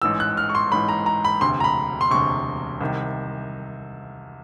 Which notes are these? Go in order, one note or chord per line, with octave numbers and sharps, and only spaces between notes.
A1 G#2 E3 E6
F#6
F6
C#6
C6
A1 G#2 E3 B5
A#5
A#5
B5
E1 D2 C3 C6
A#5
B5
C6
E1 D2 C3 C#6
C2 C3 D#3